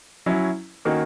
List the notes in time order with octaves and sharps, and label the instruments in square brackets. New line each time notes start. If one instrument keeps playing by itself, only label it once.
[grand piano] F#3 C#4 E4
D#3 A#3 C#4 F#4